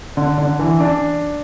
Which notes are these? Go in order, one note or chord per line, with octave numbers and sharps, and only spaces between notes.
D3
D3
E3
D4